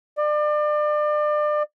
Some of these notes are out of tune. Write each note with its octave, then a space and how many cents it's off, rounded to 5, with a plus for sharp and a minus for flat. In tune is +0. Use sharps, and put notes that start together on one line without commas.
D5 +35